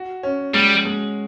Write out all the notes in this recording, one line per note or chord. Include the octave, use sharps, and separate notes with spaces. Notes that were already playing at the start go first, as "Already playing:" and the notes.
Already playing: F#4
C#4
G3 G#3
G#3